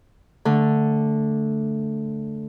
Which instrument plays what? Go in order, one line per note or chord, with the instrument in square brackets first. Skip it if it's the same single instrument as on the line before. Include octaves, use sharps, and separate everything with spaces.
[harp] D3 A3